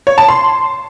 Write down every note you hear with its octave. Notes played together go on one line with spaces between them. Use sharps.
C#5
A5
C6